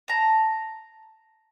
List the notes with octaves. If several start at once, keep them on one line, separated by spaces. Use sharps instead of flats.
A5 A#5